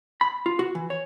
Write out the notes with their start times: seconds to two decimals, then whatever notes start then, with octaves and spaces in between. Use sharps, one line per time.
0.21 B5
0.46 F4
0.59 F#4
0.75 E3
0.90 C#5